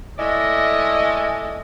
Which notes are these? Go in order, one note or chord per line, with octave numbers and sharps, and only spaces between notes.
G#3 A3 E4 D5 D#5